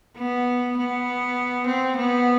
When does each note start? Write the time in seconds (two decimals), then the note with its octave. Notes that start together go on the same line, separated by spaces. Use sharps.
0.17 B3
0.77 B3
1.67 C4
1.97 B3